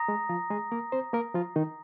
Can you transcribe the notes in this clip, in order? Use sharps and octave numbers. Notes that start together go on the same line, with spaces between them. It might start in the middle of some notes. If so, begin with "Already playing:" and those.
Already playing: A#5 D#6 A#6
G#3
F3 F4
G#3 G#4
A#3 A#4
C4 C5
A#3 A#4
F3 F4
D#3 D#4